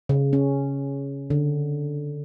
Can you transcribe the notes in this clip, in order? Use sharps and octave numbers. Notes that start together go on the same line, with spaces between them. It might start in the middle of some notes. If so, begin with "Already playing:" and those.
C#3
C#4
D3